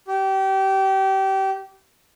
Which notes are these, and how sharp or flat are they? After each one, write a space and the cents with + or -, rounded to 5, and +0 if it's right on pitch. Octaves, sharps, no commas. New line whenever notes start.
G4 -25